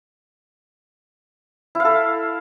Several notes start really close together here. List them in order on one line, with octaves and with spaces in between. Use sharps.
E4 F5 A4